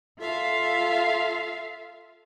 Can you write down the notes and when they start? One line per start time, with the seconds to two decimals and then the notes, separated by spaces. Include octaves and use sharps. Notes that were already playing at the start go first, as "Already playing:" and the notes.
0.20 F4 A4 E5 F5